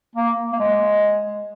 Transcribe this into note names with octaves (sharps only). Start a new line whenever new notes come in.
A#3
A#3
G#3